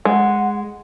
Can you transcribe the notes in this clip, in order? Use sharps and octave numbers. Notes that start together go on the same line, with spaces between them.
G#3 F#5